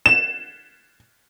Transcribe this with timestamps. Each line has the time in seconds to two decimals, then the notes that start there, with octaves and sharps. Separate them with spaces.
0.06 E7